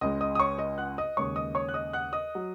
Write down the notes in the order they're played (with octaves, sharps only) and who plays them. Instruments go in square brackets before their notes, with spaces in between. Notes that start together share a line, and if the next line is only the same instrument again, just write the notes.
[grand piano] C#2 C#3 G#3 D#5 D#6
D#5 D#6
D#6
C#5 C#6
D#5 D#6
F#5 F#6
D#5 D#6
D#2 C#3 G#3 C#5 C#6
D#5 D#6
C#5 C#6
F#6
D#5 D#6
F#5 F#6
D#5 D#6
F#3